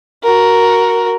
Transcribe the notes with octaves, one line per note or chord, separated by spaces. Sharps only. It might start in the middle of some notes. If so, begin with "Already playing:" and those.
F#4 A#4